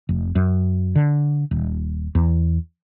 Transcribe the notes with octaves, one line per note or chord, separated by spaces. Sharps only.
F1
F#2
D3
D#1
E2